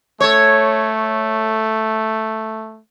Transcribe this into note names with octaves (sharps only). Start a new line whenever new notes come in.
A3 A4 C#5